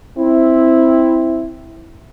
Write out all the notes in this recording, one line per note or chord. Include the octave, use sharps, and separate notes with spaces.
C4 E4